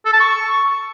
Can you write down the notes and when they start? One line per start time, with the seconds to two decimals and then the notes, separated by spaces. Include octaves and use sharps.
0.06 A4
0.13 A5
0.20 C#6